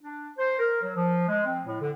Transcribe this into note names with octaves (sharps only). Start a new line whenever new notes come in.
D4
C5
A#4
F#3
F3
G#3
C4
A2
D3